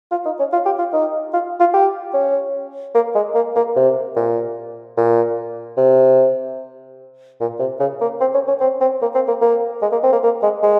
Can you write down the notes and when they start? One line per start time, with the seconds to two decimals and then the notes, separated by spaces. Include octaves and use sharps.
0.11 F4
0.25 D#4
0.39 C#4
0.52 F4
0.65 G4
0.78 F4
0.93 D#4
1.33 F4
1.60 F4
1.73 G4
2.14 C#4
2.95 A#3
3.15 G#3
3.34 A#3
3.56 A#3
3.76 C3
4.16 A#2
4.97 A#2
5.77 C3
7.40 A#2
7.59 C3
7.80 C#3
8.01 A#3
8.21 C4
8.34 C#4
8.48 C#4
8.61 C4
8.80 C4
9.02 A#3
9.15 C4
9.28 A#3
9.41 A#3
9.82 G#3
9.92 A#3
10.03 C4
10.12 A#3
10.23 A#3
10.42 G#3
10.62 G#3